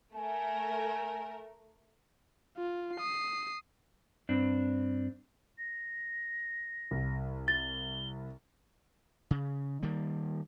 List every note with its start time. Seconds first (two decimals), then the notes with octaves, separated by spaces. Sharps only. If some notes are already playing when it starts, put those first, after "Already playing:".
0.16 A3 A#4 G#5
2.58 F4
2.97 D#6 C7
4.29 G2 C4 D4
5.58 A#6
6.91 C2
7.48 A6 G7
9.31 C#3
9.83 D#3 G3 A#3